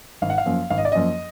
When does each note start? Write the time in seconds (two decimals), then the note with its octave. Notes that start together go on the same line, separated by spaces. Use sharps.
0.22 G#1 F5
0.30 F#5
0.38 F5
0.46 F#2 F3 A#3
0.70 G#1 F5
0.78 D#5
0.85 D5
0.92 F#2 F3 A#3 D#5